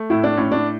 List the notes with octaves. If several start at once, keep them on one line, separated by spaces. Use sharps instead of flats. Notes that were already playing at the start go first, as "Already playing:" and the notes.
Already playing: A3
A2 E4
D4
A2 C#4
D4